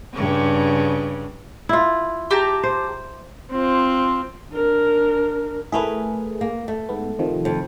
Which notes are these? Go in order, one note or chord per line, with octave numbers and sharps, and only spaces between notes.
G2 C#3
E4 F4
G4 A5 A#5
C5
C4 F4
D4 A#4
A3 E4 G#4 A#4 B4
A#3
A3
G#2 B3
C3 D#3 F3
F2